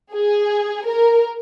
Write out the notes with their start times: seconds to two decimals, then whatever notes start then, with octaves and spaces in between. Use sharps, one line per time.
0.14 G#4
0.85 A#4